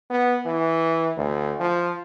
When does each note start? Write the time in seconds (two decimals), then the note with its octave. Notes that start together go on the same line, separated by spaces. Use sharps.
0.10 B3
0.45 E3
1.17 D2
1.60 F3